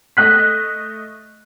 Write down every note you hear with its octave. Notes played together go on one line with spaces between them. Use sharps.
A3 D#5 F#6 B6